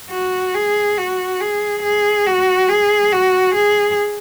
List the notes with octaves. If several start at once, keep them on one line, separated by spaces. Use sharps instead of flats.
F#4
G#4
F#4
G#4
G#4
F#4
G#4
F#4
G#4